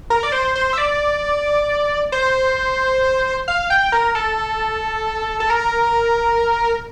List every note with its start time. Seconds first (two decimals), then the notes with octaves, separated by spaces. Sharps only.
0.10 A#4
0.23 D5
0.32 C5
0.55 C5
0.73 E5
0.78 D5
2.12 C5
3.48 F5
3.70 G5
3.92 A#4
4.15 A4
5.40 A4
5.50 A#4